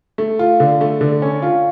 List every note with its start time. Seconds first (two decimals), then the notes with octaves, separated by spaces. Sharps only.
0.18 A3
0.39 F4
0.60 D3
0.81 A3
1.01 D3
1.22 C#4
1.42 F4